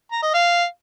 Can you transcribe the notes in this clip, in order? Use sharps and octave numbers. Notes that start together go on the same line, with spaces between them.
A#5
D#5
F5